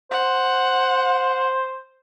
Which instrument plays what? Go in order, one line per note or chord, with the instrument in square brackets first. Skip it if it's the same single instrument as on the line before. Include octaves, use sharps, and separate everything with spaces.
[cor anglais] C5 [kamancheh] F#5